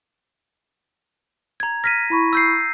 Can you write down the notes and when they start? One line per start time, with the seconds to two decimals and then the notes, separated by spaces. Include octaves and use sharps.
1.60 A#5 G#6
1.84 F6 A#6 B6 D#7
2.10 E4 B5 C#6
2.33 E6 G6 C7